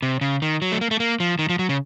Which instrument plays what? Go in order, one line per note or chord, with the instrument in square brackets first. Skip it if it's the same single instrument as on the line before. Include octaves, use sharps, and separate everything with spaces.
[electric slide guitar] C3
C#3
D#3
F#3
A3
A#3
A3
A#3
F3
D#3
F3
F#3
C#3